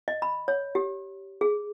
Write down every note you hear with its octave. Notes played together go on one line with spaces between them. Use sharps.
D#5
B5
C#5
G4
G#4